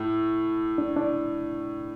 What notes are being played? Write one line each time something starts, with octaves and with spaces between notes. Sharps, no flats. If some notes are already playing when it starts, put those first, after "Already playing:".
Already playing: A2 E4
D4
D4